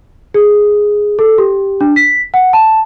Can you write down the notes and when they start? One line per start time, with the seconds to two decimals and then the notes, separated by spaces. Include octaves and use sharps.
0.34 G#4
1.19 A4
1.38 G4
1.81 D4
1.96 B6
2.34 F#5
2.53 A5